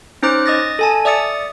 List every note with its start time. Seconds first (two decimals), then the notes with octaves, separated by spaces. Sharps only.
0.23 C#4 D#4 C5 D6 F#6
0.46 D#5 D#6 A6 A#6
0.79 A4 G#5 A5
1.05 D5 E5 D#6 A6 C#7